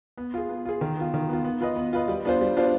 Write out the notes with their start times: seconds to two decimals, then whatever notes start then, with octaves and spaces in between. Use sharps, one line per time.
0.17 B3
0.34 F4 G#4
0.49 B3
0.65 F4 G#4
0.81 D#3
0.97 B3 F4
1.14 D#3
1.29 B3 F4
1.44 B3
1.61 F4 B4 D#5
1.76 B3
1.93 F4 B4 D#5
2.08 G3
2.25 B3 D4 F4 C5
2.41 G3
2.57 B3 D4 F4 C5